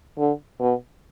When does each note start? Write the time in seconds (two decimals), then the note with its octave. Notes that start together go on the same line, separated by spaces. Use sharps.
0.18 D3
0.60 B2